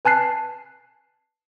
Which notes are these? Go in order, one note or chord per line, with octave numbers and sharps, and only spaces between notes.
B4 G#5 A5 F#6 C7